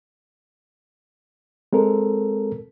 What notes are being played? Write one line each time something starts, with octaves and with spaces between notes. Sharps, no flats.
G#3 C4 A4 A#4